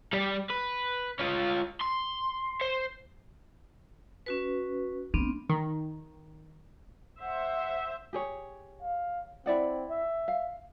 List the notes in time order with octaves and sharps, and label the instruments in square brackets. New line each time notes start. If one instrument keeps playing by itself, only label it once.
[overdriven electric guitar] G3 D5
B4
C#4 F4
C6
C5
[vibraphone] C#4 F#4 B4
[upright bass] A3 [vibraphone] B3 C4 D4
[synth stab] D#3
[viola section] C5 E5 [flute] F#5
[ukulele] G4 G#4 C#5
[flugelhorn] F5
[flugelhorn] C4 [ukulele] E4 D5 F#5
[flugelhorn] E5
[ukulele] F5